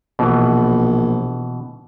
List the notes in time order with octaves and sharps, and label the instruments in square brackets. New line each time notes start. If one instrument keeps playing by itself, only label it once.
[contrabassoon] A#1 [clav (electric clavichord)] B2 E3